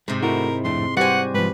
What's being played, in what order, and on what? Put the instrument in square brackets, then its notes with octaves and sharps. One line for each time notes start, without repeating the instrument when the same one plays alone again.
[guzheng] G#2 C3 [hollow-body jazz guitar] G#3
[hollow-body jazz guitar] A3 F#4 [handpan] E4 [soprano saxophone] A#4
[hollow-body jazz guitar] F2 A2 D4 [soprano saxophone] C6
[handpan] G3 G4 C5 [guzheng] F#4 G#5 [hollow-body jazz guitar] B4 D5 [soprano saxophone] F#5
[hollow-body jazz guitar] G#2 F3 [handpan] G#3 [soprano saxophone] B4